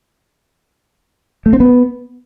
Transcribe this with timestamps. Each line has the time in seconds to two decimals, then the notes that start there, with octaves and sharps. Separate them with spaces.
1.46 A3
1.53 C4
1.60 B3